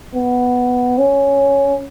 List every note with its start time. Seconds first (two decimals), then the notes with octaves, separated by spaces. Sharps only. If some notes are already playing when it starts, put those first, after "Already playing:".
0.14 B3
0.98 C#4